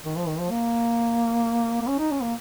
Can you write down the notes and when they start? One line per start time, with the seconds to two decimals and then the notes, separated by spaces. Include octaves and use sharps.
0.05 D#3
0.16 F3
0.28 D#3
0.39 F3
0.51 A#3
1.82 A#3
1.88 C#4
1.99 D#4
2.11 C#4
2.22 A#3